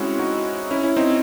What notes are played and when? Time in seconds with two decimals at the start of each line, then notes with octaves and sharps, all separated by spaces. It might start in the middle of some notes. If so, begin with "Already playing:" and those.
Already playing: G#3 C4 C#4 E4 F#4
0.19 D#4 F#4
0.71 C#4 E4
0.83 C#4 E4
0.97 C4 D#4